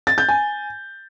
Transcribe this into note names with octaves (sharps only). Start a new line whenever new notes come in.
A6
G6
G#5